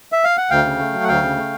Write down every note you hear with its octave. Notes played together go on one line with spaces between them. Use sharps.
E5
F5
F#5
D2 F5 G5
C#3
A3
F#3
F#5
D2 F5 G5
C#3
A3